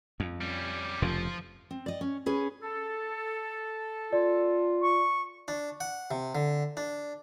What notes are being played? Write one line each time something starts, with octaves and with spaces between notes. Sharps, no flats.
F2
G3 C#4
F1 F2 C#3 F3
C4
D5 D#5
C#4
C#4 G#4 B4
A4
F4 D5
C#6
D4
F#5
C3
D3
D4